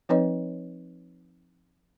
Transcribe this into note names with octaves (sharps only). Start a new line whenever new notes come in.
F3 C4 D#4 B4 C#5 D#5